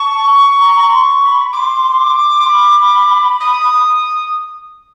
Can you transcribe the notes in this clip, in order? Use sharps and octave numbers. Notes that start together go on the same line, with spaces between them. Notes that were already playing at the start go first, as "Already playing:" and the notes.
Already playing: A5 C#6
A#5
C6
B5
C6 D6
C6
B5
D#6